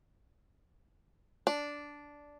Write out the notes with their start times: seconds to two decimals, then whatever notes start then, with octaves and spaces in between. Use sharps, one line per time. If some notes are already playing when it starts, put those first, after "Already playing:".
1.47 D4